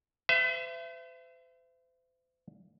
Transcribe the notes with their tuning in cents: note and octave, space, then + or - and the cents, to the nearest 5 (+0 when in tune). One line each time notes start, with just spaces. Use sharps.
C5 -45 E5 +30